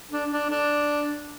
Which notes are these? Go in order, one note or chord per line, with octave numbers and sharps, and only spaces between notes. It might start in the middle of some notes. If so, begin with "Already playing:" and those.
D4
D4
D4